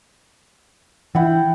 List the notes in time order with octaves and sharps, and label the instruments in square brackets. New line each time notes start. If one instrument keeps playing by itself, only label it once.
[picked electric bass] E3 [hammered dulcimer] E4 F#5 G5